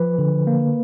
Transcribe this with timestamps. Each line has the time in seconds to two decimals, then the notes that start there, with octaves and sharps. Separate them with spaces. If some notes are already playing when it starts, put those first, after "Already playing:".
Already playing: F3 B4
0.18 D3
0.47 A#3